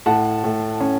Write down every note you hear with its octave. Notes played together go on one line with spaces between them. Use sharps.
A2 F#5 A5
A2
C#4